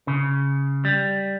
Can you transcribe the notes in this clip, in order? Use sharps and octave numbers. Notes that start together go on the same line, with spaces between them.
C#3
G3